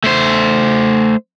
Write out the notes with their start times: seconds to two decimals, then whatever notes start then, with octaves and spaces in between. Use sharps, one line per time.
0.04 A3 C5